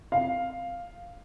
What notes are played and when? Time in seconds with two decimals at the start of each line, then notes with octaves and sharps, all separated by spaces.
0.12 F5